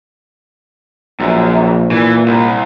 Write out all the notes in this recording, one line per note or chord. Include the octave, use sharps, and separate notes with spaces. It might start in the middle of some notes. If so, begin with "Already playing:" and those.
A#1 F#2
A#2 E3
C2